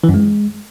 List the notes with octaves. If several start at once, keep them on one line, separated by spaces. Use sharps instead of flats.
E3
F#2
G#3